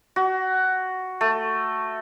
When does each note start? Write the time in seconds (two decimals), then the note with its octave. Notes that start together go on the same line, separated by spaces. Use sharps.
0.16 F#4
1.21 A3